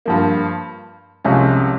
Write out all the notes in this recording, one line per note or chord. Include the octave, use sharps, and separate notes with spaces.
G2 F3 A#3
C2 C3 F3 G#3 C#4